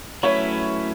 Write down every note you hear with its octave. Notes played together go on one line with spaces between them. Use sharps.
F#3 A3 C#4 E4 B4 C#5